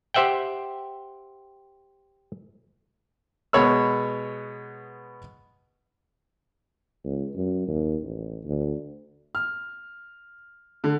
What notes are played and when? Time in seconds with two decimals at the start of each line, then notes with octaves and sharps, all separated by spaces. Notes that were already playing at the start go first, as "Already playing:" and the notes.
0.14 G4 C5 E5 F#5 G5
3.53 B2 G#3 B3 C#5 B5 E6
7.04 C#2
7.36 F#2
7.67 D#2
8.02 A1
8.44 D2
9.35 F6
10.84 D3